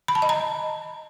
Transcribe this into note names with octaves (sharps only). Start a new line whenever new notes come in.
B5
A5
D#5
A#5